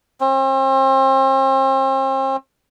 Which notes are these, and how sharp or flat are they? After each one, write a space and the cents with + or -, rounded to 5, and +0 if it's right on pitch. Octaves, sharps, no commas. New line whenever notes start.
C4 +40